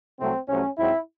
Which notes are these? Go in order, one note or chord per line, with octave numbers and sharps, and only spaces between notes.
C2 C3 F#3 A3 C4
C2 C3 F#3 A3 C#4
G#2 F#3 C4 E4